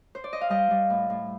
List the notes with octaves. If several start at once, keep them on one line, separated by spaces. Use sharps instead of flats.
C5
D5
D#5
F5
G3 D#5 G5
G3
A2
A2